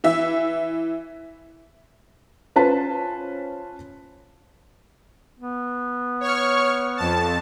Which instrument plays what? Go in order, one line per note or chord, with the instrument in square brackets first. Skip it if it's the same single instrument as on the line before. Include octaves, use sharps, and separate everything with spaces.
[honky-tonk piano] E3 E5
[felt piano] C#4 F4 B4 C5 A5
[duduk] B3
[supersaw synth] C#5 C#6 F6
F2 A5